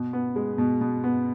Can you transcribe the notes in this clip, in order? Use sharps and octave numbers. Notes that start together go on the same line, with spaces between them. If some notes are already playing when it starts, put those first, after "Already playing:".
Already playing: B2
B3
G#3
B2
B2
B3